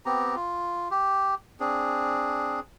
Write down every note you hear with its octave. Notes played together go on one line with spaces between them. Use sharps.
B3 C4 G4 A#5
F4
G4
C4 D4 G#4